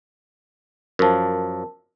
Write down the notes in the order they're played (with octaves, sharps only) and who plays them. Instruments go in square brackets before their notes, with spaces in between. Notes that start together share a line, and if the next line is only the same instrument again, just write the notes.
[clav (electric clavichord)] F#2 F3 [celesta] A#4 A5